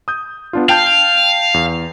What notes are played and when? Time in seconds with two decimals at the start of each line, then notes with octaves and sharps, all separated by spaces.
0.08 D#6 G6
0.53 B3 D4 F4
0.69 F5 G5 A5 G6
1.54 E2